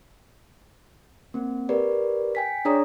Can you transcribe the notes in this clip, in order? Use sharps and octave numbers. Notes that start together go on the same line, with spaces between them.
A#3 C4
G4 A#4 B4 D5
G5 G#5 B6
D4 G#4 C#5 D5 A#5 D#6